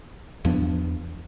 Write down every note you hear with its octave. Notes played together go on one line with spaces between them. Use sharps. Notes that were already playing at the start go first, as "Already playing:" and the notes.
E2 F3 B3 D4